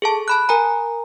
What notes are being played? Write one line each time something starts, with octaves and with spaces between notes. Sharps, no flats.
G#4 A4 A5
A5 B5 F#6
A#4 G#5 A#5